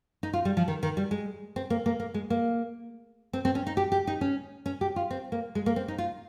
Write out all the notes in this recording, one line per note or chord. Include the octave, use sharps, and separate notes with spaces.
D#4
F4
G3
F3
D#3
D#3
G3
G#3
C4
A#3
A#3
A#3
G#3
A#3
C4
C4
C#4
D#4
G4
G4
D#4
C#4
C#4
G4
F4
C4
A#3
G#3
A#3
C4
D#4
F4